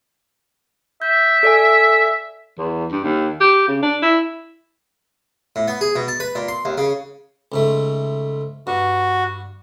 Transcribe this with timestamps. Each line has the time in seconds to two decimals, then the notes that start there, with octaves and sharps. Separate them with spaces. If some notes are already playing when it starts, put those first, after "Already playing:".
1.02 E5 G6
1.43 A4 D5 G#5
2.58 E2
2.91 G2
3.04 D#2
3.40 G4
3.68 C#3
3.82 D4
4.02 E4
5.56 A2
5.68 B3
5.81 G#4
5.96 B2
6.08 A5
6.20 B4
6.35 A#2
6.48 C6
6.65 D#2
6.78 C#3
7.52 C#2 G#2 A3
8.67 G2 F#4